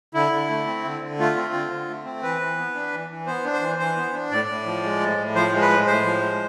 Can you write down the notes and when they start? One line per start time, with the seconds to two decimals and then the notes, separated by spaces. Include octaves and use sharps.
0.14 D3 E4
0.32 D3
0.50 A3
0.67 C4
0.84 D3
1.01 D3
1.19 A3 F4
1.36 C4
1.54 D3
1.71 D3
1.88 A3
2.05 C4
2.23 E3 B4
2.40 E3
2.57 B3
2.75 D4
2.92 E3
3.10 E3
3.27 B3 C5
3.44 D4
3.53 C5
3.61 E3
3.78 E3 C5
3.97 B3
4.13 D4
4.31 A2 D5
4.48 A2
4.66 F3
4.83 G#3
5.00 A2
5.18 A2
5.35 F3 C5
5.52 G#3
5.61 B4
5.70 A2
5.87 A2 C5
6.04 F3
6.22 G#3